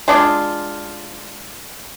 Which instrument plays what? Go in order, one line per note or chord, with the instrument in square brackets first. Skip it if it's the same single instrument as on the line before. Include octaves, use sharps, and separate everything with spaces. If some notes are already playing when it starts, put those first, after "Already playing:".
[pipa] G#3 D4 F4